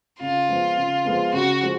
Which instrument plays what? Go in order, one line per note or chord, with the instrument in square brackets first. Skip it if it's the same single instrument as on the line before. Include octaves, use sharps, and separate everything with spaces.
[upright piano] C#3 [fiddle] F4
[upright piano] F3 G#3 B3
C#3
F3 G#3 B3
[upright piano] C#3 [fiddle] F#4
[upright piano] F3 G#3